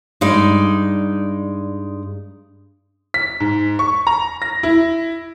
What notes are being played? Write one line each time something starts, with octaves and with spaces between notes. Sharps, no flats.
G2 G#3 D#4 D5
B6
G#2
C#6
A#5
A#6
E4